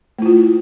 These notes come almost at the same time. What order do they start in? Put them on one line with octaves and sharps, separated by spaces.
A3 E4 F4